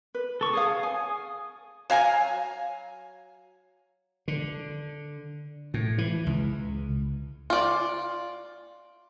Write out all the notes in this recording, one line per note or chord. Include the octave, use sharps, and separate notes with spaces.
B4
A4 C#6
G#4 C#5 F5 D#6
G#5
F#3 F5 G#5 A#5
D3
A2
E3
C#2
F4 D5